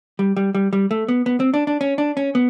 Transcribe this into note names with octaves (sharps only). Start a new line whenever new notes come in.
G3
G3
G3
G3
A3
B3
B3
C4
D4
D4
C#4
D4
C#4
B3